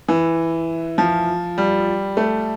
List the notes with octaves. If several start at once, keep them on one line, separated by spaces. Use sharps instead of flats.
E3
F3
G3
A3